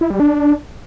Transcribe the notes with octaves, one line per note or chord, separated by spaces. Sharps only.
E4
G3
D4